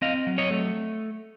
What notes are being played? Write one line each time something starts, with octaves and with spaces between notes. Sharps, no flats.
C4 D#5 F5
F#3
C#5 D#5
A3